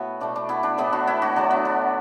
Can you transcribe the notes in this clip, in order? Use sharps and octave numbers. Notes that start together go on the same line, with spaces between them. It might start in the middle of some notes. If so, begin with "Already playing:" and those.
Already playing: A2 B3 E4 F#4
B2 A3 D4
D4
B3 E4
D4
A2 E3 A3 B3 E4
D4 F#4
B3 E4
D4 F#4
D3 F#3 A3 D4
B3
D4